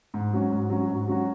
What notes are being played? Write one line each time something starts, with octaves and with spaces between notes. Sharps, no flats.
G#2
F#3 C#4 F#4
G#2
F#3 C#4 F#4
G#2
F#3 C#4 F#4